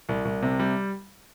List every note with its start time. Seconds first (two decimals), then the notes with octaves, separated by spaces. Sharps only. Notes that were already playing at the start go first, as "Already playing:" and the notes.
0.09 C2
0.25 C2
0.42 C3
0.59 G3